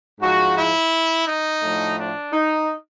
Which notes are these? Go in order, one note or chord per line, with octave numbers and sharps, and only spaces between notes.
G#2 F3 G#3 F#4
E4
D#4
A2 F3 A3 D4
D4
D#4